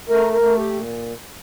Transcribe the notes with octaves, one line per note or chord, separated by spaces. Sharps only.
A3 A#4
A#4
A3
G4
A#2